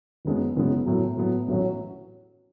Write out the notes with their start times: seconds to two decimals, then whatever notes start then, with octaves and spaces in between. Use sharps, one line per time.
0.25 F#1 F#2 C#3 G#3 B3
0.56 F#1 F#2 C#3 G#3 B3
0.86 A2 F#3 B3
1.17 A2 F#3 B3
1.48 A1 A2 F#3 C#4 F#4